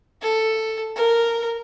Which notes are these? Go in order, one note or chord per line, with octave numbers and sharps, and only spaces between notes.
A4
A#4